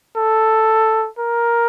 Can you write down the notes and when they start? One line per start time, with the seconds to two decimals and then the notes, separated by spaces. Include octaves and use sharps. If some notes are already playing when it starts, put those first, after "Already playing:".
0.16 A4
1.19 A#4